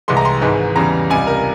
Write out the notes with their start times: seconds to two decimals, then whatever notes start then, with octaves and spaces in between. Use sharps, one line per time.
0.08 C2 C3 E3 G#3 C6
0.17 A#5
0.25 C6
0.41 G#1 G#2 E3 G#3
0.76 E2 C#3 E3 G3 A#5
1.10 C#2 C3 G3 G#5
1.27 A#4